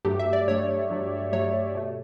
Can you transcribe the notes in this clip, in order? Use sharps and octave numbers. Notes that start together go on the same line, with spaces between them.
G2 F#3 A3 G4
E5
D5
G2 F#3 A3 C#5
G2 F#3 A3
G2 F#3 A3 C#5
B2 A3